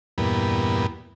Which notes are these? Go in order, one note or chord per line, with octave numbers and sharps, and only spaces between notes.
E2 G2 A#2 B3